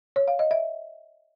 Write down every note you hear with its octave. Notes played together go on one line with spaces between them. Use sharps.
C#5
F5
D#5
E5